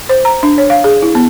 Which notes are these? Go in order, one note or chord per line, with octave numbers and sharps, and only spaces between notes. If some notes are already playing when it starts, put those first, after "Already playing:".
C5
A#5
D4
C#5
F5
G#4
E4
B3